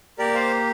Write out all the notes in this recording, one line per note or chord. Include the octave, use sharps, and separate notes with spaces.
A#3 G4 A#4 D5
C5 F5